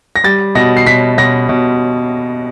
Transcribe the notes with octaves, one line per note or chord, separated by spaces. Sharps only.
A#6
G3 A6
B2 A#6
C7
B2 B6
B2 A#6
B2